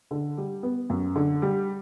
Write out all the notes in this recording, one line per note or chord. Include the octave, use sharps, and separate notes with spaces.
D3
G3
B3
F#2
D3
G3